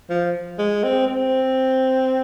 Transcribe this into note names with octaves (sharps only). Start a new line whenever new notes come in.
F3
G#3
C4
C4